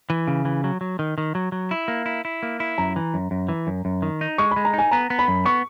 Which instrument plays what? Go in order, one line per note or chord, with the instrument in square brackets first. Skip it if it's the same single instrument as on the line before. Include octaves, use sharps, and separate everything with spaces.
[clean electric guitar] E3
C#3
E3
F#3
F#3
D#3
D#3
F#3
F#3
E4
A#3
E4
E4
A#3
E4
[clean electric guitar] F#2 [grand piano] A#5
[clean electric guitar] E3
F#2
F#2
E3
F#2
F#2
D#3
D#4
[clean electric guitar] G#3 [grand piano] C#6
[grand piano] B5
[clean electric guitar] G#3
[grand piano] A#5
[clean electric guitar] D#4 [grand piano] G#5
[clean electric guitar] B3 [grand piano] A#5
[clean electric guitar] B3
[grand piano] B5
[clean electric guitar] F#2
[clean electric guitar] B3 [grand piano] C#6